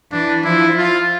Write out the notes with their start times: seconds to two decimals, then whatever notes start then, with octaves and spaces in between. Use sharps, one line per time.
0.12 E3 D4
0.44 F3 E4
0.77 F4